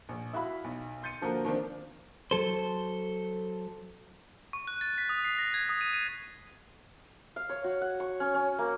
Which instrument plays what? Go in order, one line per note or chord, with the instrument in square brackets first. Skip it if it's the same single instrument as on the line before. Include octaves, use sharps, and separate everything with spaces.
[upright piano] A#1
E4 F#4 F5 B5
B1
C6 G6 A6 C#7 D#7
D3 F3 A#3 F#4 A#4
D#3 F3 C4 D4
[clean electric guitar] F#3 A4 C5
[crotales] C#6
F#6
A6
B6
D#6
C7
A#6
G#6
D#6
D#7
D#7
[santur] F5
C#5
F#4
F#5
C#6
C#4
C#4
A#3